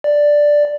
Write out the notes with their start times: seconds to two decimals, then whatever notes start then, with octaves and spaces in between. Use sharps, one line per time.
0.04 D5